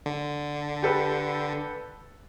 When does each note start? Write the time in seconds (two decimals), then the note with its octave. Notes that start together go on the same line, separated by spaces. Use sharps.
0.06 D3
0.82 G4 A4 B4